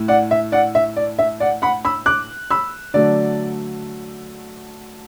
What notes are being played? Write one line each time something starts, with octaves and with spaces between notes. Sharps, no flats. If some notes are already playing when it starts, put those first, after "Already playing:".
Already playing: A2 A3
D5 F#5
E5
D5 F#5
E5
D5
E5
D5 F#5
F#5 B5
B5 E6
D6 F#6
B5 E6
D3 F#3 A3 D5